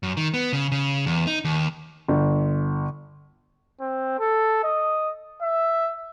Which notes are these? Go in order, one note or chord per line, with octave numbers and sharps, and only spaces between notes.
F#2
D#3
B3
C#3
C#3
E2
D#4
D#2
G1
C4
A4
D#5
E5